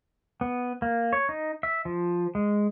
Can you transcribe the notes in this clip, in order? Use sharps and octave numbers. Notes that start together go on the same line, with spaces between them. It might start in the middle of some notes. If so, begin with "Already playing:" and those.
B3
A#3
C#5
D#4
E5
F3
G#3